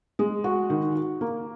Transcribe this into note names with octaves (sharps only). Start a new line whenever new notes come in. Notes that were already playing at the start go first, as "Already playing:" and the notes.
G#3
F#4
D#3
F#4
A#3